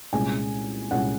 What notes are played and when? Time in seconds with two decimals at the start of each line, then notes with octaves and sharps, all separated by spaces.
0.13 C2 A#2 G#3 C#4 G#5
0.91 C2 A#2 G#3 C#4 F#5